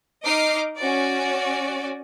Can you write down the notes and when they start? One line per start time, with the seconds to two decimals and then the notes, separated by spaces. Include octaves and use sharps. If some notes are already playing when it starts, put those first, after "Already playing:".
0.23 D#4 D#5 D6 F6 C7
0.78 C#4 F#4 D5